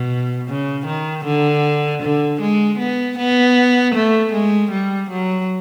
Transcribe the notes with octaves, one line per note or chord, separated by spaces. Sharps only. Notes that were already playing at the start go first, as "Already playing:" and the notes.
Already playing: B2
C#3
D#3
D3
D3
G#3
B3
B3
A3
G#3
G3
F#3